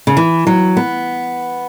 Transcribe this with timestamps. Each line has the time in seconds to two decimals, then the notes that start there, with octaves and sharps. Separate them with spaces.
0.07 C#3
0.17 E3
0.47 F#3
0.77 B3